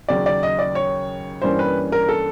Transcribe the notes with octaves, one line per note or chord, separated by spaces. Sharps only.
D#2 C#3 F#3 D5
D5
D#5
D5
C#5
G2 E3 G3 A#3 C#4 C5
B4
A#4
A4